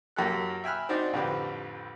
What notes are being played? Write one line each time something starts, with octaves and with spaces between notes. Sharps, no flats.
F#2 A#3 G4 A4 F#6
E5 G5 G#5 B5 F6 F#6
C4 D4 D#4 F#4 C5 D5
A1 F2 D3 C4 G4 B4